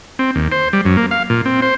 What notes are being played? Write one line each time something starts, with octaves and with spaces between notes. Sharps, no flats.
C4
D#2
C5
G3
F#2
A#3
F5
A#2
C4
C5